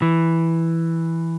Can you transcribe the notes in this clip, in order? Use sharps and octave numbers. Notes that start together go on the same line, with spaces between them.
E3